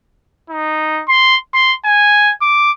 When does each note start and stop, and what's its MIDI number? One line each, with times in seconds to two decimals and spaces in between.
0.50 1.03 63
1.09 1.37 84
1.54 1.74 84
1.85 2.33 80
2.41 2.71 86